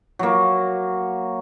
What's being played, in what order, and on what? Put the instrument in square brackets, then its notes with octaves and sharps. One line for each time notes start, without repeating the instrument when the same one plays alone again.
[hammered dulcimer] F#3 A#3